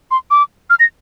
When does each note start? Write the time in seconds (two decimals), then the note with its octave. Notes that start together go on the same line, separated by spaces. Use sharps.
0.11 C6
0.31 D6
0.70 F6
0.80 A#6